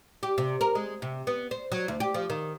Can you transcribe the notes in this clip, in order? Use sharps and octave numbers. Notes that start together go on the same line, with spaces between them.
G4
C3
A#4
G#3
C3
B3
C5
F#3
D2
G4
F3
D#3